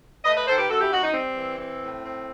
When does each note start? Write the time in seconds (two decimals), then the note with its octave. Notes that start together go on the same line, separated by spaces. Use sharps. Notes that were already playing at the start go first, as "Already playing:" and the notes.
0.24 A3 B4 D#5
0.35 B4 D#5
0.46 D#3 A4 C5
0.58 G4 B4
0.69 F#2 F#4 A4
0.81 E4 G4
0.92 F#2 D#4 F#4
1.03 D#4
1.14 G3 C4
1.37 E3
1.59 C4
1.82 A2
2.04 C4